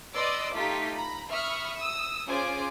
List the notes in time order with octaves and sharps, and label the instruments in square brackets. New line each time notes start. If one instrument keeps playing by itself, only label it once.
[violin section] B4 D5 D#5 C6 D6 E6
A3 D#4 F4 G4 B6
A#5 B5
E5 B5 C#6 D#6 F6
D#6 E6
C#4 F4 G#4 C5 G#5 D6